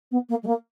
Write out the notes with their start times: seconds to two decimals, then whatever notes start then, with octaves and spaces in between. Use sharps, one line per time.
0.11 B3
0.29 A#3
0.43 G#3
0.47 A#3